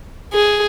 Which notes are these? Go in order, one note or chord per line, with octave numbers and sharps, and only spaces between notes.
G#4